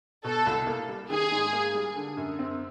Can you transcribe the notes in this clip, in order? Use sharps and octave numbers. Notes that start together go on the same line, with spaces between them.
B2 A4
C2
A#3
G3
D#3 G#4
G#2
A#3
G3
D3
F#2
C4